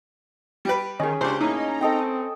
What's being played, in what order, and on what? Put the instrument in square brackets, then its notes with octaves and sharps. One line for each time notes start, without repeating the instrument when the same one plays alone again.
[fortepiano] G3 G4 B4
[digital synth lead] D#3 [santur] C#4 G#4
[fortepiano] C#2 D4 [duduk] G4 [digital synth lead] C5 [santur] C#6
[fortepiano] A2 A#3 [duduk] C#4 [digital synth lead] D#4
[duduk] C4 [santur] A4 D#5 G5